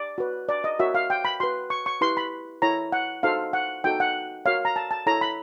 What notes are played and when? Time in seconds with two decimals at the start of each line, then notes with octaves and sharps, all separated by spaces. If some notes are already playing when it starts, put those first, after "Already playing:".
Already playing: D5
0.18 F#4 B4
0.49 D5
0.64 D#5
0.79 F#4 A#4 C#5 E5
0.94 F5
1.10 G5
1.25 B5
1.40 F#4 B4 C6
1.70 C#6
1.86 C#6
2.01 E4 G4 B4 C6
2.17 B5
2.62 E4 A4 C#5 A#5
2.92 F#5
3.23 D#4 F#4 A4 C5 F5
3.53 F#5
3.84 D#4 F#4 A4 G5
4.00 F#5
4.46 F#4 A#4 C#5 F5
4.65 A#5
4.76 A5
4.91 A5
5.07 E4 A4 C#5 A#5
5.21 B5